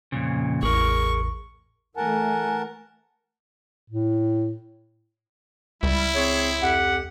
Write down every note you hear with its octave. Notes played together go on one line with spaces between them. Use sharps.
F2 A#2 C#3
A1 E2 G#4 A#4 C#6
E3 A3 A#4 F#5 G#5 A5
A2
C#2 G3 E4
C4 G#4 C#5
F2 G4 F#5